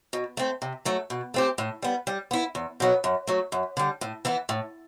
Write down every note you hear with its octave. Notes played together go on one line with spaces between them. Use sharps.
B2
A3 C4
C3
F#3 A3
B2
A3 C4 G4
A2
G3 B3
G3
B3 E4
E2
B2 F#3 B3
F#2
F#3 A3
F#2
D3 G3
A2
E3 B3 E4
A2